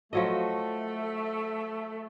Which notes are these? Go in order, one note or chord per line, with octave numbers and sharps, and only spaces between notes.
F3 F#3 A3 D#5